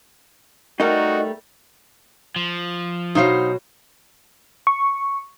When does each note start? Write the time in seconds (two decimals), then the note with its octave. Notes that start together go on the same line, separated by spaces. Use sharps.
0.80 G3 A3 D#4 F#4 A#4
2.36 F3
3.15 B2 F#3 D#4 C5 F5
4.67 C#6